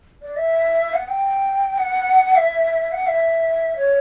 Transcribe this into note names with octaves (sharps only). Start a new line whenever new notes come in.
D5
E5
F#5
G5
F#5
E5
F#5
E5
C#5